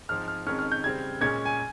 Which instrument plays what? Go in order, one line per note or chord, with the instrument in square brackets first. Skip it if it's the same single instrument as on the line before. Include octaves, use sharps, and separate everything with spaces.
[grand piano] G#2 F3 C4 F6
F6
F2 D#3 G#3 C#4 F6
F6
G6
C#3 G3 C4 G#6
A#2 G#3 C#4 G#6
G#5